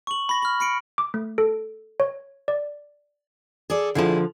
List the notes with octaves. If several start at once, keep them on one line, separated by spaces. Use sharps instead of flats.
C#6 F#7
B5 A#6
B5 F6
B5 C#7 D7
D6
A3
A4
C#5
D5
G#4 A4 D5
D3 F3 E4 G#4